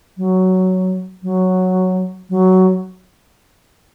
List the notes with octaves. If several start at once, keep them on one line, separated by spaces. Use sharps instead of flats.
F#3
F#3
F#3